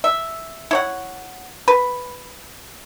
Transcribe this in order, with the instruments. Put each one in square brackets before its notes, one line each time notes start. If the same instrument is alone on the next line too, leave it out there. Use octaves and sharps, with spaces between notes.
[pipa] E5
E4 C#5 F#5
B4